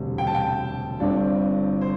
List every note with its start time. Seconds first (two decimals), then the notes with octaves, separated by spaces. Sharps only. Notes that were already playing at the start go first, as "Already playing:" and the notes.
Already playing: E1 D2 C3 G3 C4
0.18 G5
0.27 A5
0.35 G5
1.00 G1 G2 D3 C4 D5
1.81 C5